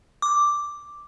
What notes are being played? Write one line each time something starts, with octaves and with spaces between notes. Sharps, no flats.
D6